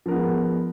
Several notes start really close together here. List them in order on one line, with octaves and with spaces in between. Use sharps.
F3 A#4 B3 G#3